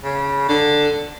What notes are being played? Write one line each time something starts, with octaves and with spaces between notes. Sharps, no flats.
C#3
D3